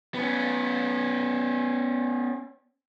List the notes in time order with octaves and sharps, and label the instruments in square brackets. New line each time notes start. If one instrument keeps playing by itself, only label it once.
[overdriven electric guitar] B3 C#4